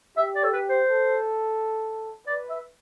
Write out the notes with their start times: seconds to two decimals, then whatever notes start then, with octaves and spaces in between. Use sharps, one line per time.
0.17 G4 E5
0.35 D5
0.44 A4
0.53 B4
0.69 C5
0.87 A4
2.27 B4 D5
2.49 E5